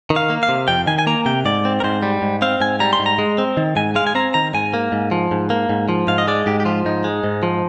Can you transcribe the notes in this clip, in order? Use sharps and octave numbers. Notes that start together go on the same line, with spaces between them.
D#3
F5
A#3
F5
C3
F2 G5
D#3 G#5
G#5
A#3 A#5
C3 G5
G#2 D5
C4
A#4
G#2 C5
G3
G#2
C4 F5
G#2 G#5
G3 A#5
C6
G#2
A#5
G#3
C4
D#3
G#2 G#5
G#3 F5
G#5
C4 A#5
D#3 A#5
G#2 G#5
A#3
G#2
F3
G#2
A#3
G#2
F3
G#2 F5
D#5
G#3 D5
G#2 G4
G4
F3 F4
G#2 D#4
G#3
G#2
F3